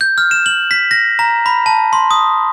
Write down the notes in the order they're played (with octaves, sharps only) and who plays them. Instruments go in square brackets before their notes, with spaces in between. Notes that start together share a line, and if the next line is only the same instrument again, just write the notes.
[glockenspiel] G6
F6
E7
F#7
B6
A#6
A#5
B5
A5
C6
D#6